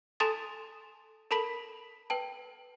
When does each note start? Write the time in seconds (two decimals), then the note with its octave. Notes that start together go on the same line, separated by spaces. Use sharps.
0.20 A4 G#5 A5 C6 D#6 A6
1.31 A4 A#4 A5 B5 B6 F#7
2.10 B4 G5 A5